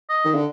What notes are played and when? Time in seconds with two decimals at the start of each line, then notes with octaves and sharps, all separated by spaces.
0.09 D#5
0.25 D#3
0.35 D3